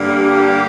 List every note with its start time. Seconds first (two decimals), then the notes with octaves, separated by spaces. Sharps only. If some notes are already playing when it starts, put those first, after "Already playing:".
Already playing: G2 D3 G3 A#3
0.17 G4